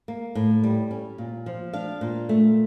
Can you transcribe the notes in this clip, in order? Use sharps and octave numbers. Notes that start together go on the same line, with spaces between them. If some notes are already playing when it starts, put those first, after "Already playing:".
A#3
A2
G3
C#4
A#2
F3
D4 F5
A#2
A3